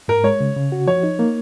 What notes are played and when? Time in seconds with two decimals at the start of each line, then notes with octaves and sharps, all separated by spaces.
0.08 G#2 A#4
0.24 G#3 C#5
0.41 C#3
0.56 C#3
0.72 F#4
0.87 F3 C#5
1.03 D#4
1.19 A#3